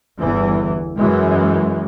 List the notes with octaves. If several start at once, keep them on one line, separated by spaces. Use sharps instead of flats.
G1 E2 E3
F#2 E3 G#3